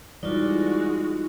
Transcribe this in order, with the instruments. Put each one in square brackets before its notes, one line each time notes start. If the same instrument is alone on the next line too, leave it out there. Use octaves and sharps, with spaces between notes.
[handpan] E3 G3 D5 [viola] G#3 F#4 [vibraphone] D#4 F4